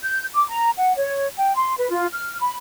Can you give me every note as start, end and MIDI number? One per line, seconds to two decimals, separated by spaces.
0.03 0.25 91
0.34 0.45 86
0.49 0.70 82
0.77 0.94 78
0.96 1.27 73
1.37 1.54 79
1.56 1.75 84
1.77 1.90 71
1.91 2.06 65
2.14 2.38 89
2.41 2.55 83